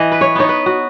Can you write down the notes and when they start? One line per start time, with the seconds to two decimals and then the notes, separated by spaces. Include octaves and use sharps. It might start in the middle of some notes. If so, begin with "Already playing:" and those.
Already playing: E3 D#5
0.12 B4
0.21 C#5
0.35 B3 D#4 C#5
0.49 B4
0.66 F#4